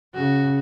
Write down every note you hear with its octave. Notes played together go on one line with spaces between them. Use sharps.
C#3 F#4